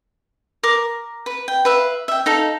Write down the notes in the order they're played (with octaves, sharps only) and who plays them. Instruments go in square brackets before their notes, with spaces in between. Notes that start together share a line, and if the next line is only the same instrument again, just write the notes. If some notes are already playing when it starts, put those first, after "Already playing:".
[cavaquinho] A#4 D6
B4
G5
B4 E5 F5
E5 G5
D#4 A4 F5